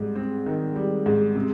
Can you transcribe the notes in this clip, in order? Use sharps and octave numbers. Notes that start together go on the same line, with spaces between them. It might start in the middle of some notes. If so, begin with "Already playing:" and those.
Already playing: G#2 G3 C4
C4
D#3
G3
G#2
C3